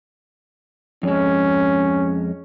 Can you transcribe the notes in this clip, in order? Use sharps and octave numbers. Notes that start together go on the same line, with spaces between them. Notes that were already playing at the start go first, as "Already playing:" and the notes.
F2 G#3 C#4